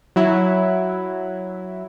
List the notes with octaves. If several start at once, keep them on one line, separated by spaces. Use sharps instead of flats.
F#3 E4